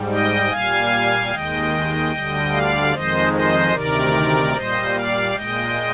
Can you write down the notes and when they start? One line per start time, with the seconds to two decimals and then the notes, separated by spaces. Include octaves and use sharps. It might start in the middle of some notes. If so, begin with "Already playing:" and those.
Already playing: G#2 G3
0.11 D#5 G5
0.50 A#2 G3 F5 G#5
1.31 D#2 D#3 G#3 D#5 G5
2.11 D2 D3 G3
2.52 D5 F5
2.92 F2 D#3 G#3 C5 D#5
3.32 C5 D#5
3.72 D2 C3 D#3 A#4 D5
4.53 A#2 G3 C5 D#5
4.94 D5 F5
5.34 A#2 G#3 D#5 G5